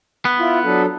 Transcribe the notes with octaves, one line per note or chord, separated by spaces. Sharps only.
B3
E4 F4
F#3 D4 A4